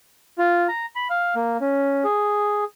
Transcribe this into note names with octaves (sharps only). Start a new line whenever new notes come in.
F4
A#5
B5
F5
A#3
C#4
G#4